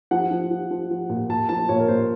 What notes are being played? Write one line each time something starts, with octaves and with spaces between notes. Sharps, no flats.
F3 F#5
F3
F3
F3
F3
A#2
A#2 A5
F3 A5
A#2 C#5
A#4
A#2 C5